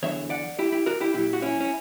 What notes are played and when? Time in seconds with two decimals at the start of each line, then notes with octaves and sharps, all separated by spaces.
0.03 E2 D3 F#3 C#5 E5
0.30 D5 F#5
0.59 E4 G4
0.72 E4 G4
0.86 F#4 A#4
1.00 E4 G4
1.14 A#2 F#3 E4 G4
1.33 F#4
1.42 C#4 E4
1.61 C#4